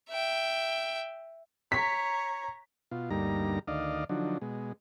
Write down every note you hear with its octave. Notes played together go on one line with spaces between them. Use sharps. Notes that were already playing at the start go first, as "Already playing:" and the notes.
E5 G5
C#5 A#5 B6
B2 F4
D2 G2 G3 A#3 D#4 A#5
D2 D#3 D5 D#5 F5
D3 F3 F#3 D4 D#4
B2 G#3